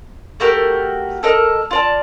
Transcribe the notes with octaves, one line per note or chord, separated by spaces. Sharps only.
A3 F#4 G4 A#4
A4 A#4 D#5
F4 D5 A5